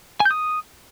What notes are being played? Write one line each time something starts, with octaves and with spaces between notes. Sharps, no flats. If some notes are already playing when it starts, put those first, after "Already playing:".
G#5
G6
D#6